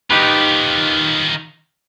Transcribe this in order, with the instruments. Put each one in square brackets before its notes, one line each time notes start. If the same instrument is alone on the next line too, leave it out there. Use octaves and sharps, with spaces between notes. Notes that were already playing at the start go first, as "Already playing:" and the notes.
[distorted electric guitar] D#3 F4 [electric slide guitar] D#4 G4 B4